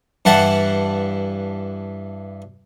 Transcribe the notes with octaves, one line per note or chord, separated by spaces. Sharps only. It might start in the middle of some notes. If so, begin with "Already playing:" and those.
G2 E3 F#5 A5